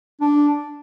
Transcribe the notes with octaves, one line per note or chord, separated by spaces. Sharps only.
D4